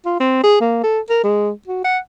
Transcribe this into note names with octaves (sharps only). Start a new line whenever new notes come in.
F4
C4
G#4
A#3
A4
A#4
G#3
F#4
F#5